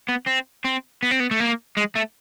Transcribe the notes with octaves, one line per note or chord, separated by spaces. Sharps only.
B3
C4
C4
B3
C4
B3
A3
A#3
G#3
A3